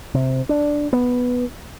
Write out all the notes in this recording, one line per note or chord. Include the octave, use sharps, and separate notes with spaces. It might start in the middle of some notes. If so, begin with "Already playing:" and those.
C3
D4
B3